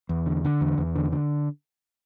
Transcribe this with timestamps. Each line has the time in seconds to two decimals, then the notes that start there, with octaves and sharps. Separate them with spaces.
0.09 E2
0.26 D3
0.45 D3
0.61 E2
0.78 E2
0.96 D3
1.12 D3